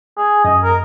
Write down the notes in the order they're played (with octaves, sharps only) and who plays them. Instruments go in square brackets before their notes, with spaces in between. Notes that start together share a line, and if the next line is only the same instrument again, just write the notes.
[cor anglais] G#4
[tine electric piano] F#2 [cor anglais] D#5
[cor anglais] A#4